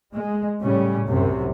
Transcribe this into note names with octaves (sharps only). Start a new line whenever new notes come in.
G#3
A2 C#3 G3 C#4
C2 F#2 C3